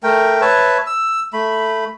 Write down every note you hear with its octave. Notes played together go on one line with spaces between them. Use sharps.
A3 A#4 G5
B4 C#5 E5 A5
E6
A3 B5